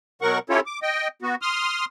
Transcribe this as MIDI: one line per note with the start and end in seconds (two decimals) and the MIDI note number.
0.22 0.39 47
0.22 0.39 54
0.22 0.39 70
0.22 0.39 78
0.22 0.39 85
0.50 0.60 61
0.50 0.60 64
0.50 0.60 65
0.50 0.60 67
0.50 0.60 69
0.50 0.60 73
0.66 0.79 86
0.82 1.08 75
0.82 1.08 79
1.22 1.35 59
1.22 1.35 66
1.42 1.85 84
1.42 1.85 87
1.42 1.85 89